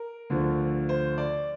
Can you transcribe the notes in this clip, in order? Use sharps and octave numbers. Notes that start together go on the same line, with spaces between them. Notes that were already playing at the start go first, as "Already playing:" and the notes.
Already playing: A#4
D2 D3 F3
C5
D5